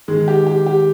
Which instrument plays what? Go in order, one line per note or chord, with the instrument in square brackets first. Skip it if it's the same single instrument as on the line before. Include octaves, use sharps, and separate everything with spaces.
[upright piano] D#3 [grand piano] G#3
[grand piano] G4
G4
G4